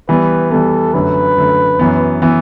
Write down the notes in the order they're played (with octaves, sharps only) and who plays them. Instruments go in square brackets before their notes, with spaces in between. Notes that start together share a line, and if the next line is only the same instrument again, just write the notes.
[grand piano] E3 G3 B3 [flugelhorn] B4
[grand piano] E3 G3 B3 [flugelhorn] A4
[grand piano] F#2 D3 A3 [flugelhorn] B4
[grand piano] F#2 D3 A3
F#2 E3 B3
E3 B3